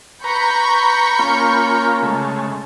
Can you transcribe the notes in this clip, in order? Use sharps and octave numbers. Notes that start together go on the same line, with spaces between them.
B4 A#5 B5 C#6 G6
A#3 C#4 F4
C#3 G#3 A3